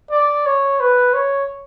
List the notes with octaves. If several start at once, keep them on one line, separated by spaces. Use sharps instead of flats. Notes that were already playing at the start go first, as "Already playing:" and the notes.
D5
C#5
B4
C#5